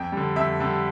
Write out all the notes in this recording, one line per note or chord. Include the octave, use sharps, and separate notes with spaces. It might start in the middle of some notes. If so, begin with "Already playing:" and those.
Already playing: F2 G5
D3 G3
F2 E5
D3 G3